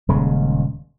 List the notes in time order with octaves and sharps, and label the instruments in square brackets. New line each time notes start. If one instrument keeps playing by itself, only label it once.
[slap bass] D#1 C#3 G#3